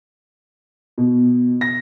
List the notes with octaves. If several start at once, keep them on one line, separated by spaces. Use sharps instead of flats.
B2
A#6